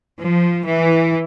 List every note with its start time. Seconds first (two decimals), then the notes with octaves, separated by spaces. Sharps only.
0.21 F3
0.65 E3